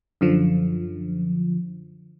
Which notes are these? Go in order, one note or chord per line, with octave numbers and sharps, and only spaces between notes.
F#2 D3 F3